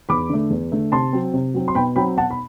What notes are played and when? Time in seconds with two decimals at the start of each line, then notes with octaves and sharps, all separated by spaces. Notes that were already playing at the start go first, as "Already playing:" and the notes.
0.09 E2 B5 D6
0.30 D3 A3
0.50 E2
0.72 D3 A3
0.92 C3 A5 C6
1.13 F#3 C4
1.34 C3
1.54 F#3 C4
1.68 C6
1.75 B2 G5 B5
1.96 F#3 C4 G5 B5
2.17 B2 F#5 A5
2.31 B5